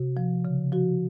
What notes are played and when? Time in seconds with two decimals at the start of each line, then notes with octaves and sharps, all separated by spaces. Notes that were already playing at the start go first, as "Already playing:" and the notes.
Already playing: C3 F#4
0.17 F3
0.45 C#3
0.72 F3 F#4